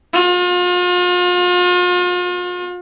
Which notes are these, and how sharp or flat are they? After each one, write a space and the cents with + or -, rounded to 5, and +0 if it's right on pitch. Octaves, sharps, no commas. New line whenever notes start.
F4 +40